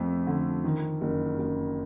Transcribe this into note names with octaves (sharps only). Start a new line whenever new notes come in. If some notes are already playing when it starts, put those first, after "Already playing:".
Already playing: F2 F3 A3
D3
D#3
F#1
F#1